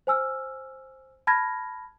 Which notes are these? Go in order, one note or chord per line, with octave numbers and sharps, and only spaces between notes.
C5 G#5 E6 F6
A5 B5 F6 G#6 A#6